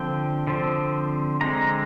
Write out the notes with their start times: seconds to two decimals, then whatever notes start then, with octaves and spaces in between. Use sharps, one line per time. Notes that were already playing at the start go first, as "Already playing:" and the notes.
Already playing: D3 F3 C4 G5
0.47 D3 F3 C4
1.41 D3 G#3 C4 A#5